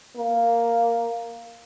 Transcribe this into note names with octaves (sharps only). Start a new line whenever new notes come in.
A#3